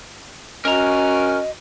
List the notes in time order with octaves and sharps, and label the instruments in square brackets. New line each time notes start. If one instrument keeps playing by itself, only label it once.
[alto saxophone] C#4 [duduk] F#4 [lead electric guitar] A#4 A#5 [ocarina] D#5